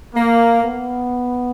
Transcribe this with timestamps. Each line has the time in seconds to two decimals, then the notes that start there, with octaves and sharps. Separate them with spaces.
0.15 A#3
0.63 B3